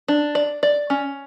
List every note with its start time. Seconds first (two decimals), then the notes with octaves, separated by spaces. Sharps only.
0.08 D4
0.35 D5
0.63 D5
0.90 C#4